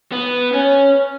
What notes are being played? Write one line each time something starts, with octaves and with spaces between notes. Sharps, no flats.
B3
C#4